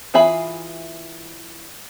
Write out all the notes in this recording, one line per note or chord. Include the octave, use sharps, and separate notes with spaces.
E3 F4 G#4 E5 B5